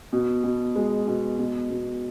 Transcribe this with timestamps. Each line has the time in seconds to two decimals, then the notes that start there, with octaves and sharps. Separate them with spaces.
0.13 B2
0.44 B2
0.76 G#3
1.08 B2
1.39 B2
1.70 B2